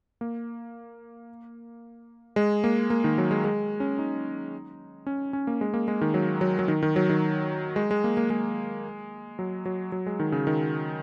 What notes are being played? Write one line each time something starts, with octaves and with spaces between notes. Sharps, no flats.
A#3
G#3
A#3
A#3
D#3
F#3
G#3
G#3
C#4
D#4
C#4
C#4
A#3
G#3
A#3
G#3
D#3
F#3
F#3
F#3
D#3
D#3
F#3
D#3
G#3
G#3
A#3
A#3
G#3
F#3
F#3
F#3
G#3
D#3
C#3
D#3